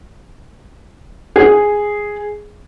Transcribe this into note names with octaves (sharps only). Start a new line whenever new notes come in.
G#4